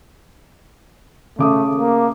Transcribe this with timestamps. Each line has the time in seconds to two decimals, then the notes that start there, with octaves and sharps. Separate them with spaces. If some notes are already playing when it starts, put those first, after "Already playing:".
1.39 C#3 A3 D6 D#6
1.75 A#3